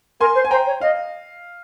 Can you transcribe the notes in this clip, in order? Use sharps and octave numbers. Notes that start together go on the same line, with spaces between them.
A#4 G#5 C6
C5
G#5
C5 G5 A#5
C#5
D#5 F5